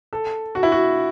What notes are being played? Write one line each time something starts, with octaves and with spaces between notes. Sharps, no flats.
A4
F#4
E4
F#4